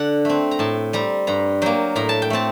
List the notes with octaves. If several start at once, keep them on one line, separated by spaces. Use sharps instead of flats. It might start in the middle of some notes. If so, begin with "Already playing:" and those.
Already playing: D3 F#5
A3 C4
A#5
A2 A5
G3 C4 A#5
G2 A#5
F#3 A#3 G5
A2 A#5
A5
G5
A3 C4 A5